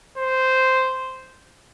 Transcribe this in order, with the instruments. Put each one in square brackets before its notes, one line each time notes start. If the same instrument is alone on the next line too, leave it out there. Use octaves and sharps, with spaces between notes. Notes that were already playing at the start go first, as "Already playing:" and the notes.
[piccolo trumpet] C5